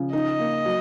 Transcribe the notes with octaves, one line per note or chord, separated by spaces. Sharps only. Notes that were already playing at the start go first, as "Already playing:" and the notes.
Already playing: C#3 F3
D#4 D#5
A#3
F#3